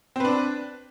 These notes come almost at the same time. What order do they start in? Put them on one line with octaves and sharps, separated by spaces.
C4 B4 D4